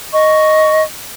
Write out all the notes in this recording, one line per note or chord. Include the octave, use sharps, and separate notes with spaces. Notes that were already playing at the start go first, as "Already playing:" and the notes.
D#5 C#6